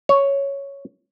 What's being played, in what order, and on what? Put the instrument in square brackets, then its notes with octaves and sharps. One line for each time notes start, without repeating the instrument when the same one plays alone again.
[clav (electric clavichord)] C#5